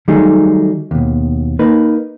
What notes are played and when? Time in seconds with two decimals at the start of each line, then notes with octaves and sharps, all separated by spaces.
0.08 D#3 F#3 G3 A3 D#4 G#4
0.91 D#2 B2
1.59 A#3 D#4 B4